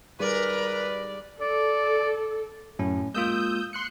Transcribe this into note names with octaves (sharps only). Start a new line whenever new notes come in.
G3 D#4 G#4 A#4 B4 D5
A4 D5
F#2 A2 C#4
G#3 A#3 F4 D#6 E6 G6
C6 F#6 C#7